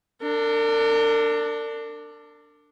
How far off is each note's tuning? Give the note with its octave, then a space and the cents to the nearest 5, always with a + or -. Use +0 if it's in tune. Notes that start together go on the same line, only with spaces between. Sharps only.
D4 +5 A#4 -40